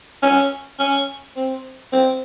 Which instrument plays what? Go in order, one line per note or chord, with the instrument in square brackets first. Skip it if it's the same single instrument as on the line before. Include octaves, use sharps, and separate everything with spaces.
[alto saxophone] C#4
C#4
C4
C4